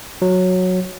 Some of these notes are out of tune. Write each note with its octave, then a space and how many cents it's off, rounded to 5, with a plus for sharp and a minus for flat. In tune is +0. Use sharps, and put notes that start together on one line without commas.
F#3 -10